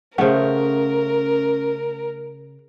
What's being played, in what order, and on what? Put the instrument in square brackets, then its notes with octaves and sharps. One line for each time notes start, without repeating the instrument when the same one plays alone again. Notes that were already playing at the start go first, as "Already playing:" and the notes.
[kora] C#3 A3 [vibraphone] C#4 [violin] A#4 [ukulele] C5 E5 F#5